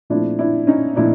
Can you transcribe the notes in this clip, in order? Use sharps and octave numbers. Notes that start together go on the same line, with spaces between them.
A#2 F3 A3 C4 D4 E4
D4 E4
C#4 D#4
A#2 F3 A3 C4 D4 E4